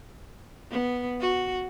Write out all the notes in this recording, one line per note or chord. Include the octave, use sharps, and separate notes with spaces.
B3
F#4